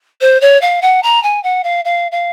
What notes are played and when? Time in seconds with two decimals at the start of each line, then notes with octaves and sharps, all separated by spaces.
0.21 C5
0.41 C#5
0.61 F5
0.82 F#5
1.03 A#5
1.23 G#5
1.43 F#5
1.64 F5
1.85 F5
2.12 F5